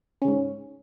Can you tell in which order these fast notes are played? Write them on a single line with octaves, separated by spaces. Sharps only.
C#4 C#3 G#2